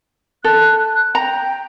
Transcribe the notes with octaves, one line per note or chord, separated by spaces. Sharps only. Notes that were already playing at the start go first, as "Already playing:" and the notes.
A4 F#6
G5 A#5